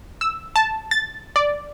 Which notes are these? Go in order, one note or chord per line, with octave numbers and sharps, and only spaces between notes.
E6
A5
A6
D5